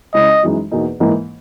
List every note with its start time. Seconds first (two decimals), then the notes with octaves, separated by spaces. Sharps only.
0.14 C#3 G#3 C#4 E4 D#5
0.43 F#2 E3 G#3 D#4
0.71 E2 B2 A#3 D#4
1.00 G#2 E3 A#3 D#4